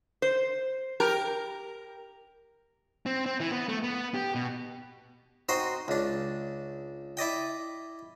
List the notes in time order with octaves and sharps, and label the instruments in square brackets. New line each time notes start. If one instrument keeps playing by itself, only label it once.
[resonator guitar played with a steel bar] C5
[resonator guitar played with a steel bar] G4 [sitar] A#4
[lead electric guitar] C4
C4
E3
B3
A3
B3
G4
B2
[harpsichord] C4 D#4 F#4 C5 D#5
C#2 D4
E4 D5 D#5 G5